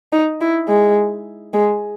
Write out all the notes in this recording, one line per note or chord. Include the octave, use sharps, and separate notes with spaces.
D#4
E4
G#3
G#3